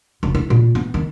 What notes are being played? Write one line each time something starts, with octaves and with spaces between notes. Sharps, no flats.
F1
E4
A#2
B3
D#3